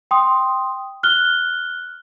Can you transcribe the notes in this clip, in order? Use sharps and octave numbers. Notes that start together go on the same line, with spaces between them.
G5 C6 D#6
F6 F#6 G7